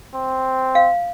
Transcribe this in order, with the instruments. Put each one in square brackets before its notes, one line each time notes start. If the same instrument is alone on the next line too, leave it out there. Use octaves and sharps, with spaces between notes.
[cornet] C4
[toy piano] F5